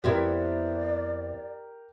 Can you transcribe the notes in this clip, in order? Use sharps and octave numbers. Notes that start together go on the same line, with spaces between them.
F2 B3 C4 E4 G4 A#4 D5